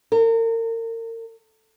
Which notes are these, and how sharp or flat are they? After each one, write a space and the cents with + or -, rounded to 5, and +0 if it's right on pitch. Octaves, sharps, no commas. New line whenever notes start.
A#4 -35